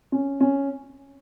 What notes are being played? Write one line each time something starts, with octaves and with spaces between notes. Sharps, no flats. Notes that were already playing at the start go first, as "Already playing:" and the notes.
C#4
C#4